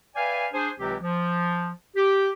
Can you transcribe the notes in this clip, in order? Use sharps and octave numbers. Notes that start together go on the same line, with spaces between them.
B4 D5 E5 F5 G5 G#5
D4 G#4 C5 G#5
C#2 C3 E3 F#3 C4 G4
F3
G4